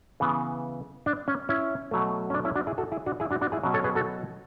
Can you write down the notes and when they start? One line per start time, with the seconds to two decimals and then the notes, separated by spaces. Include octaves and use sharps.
0.20 C#3 E3 B3
1.06 D4
1.28 C#4
1.49 C#4 E4
1.91 B2 F#3 A3
2.30 C#4
2.34 D4
2.45 C#4 E4
2.56 D4 F#4
2.67 E4 G#4
2.78 F#4 A4
2.92 E4 G#4
3.06 D4 F#4
3.20 E4 G#4
3.31 D4 F#4
3.41 D4 F#4
3.52 E4 G#4
3.63 B2 F#3 C#4
3.74 A4 C#5
3.84 G#4 B4
3.95 F#4 A4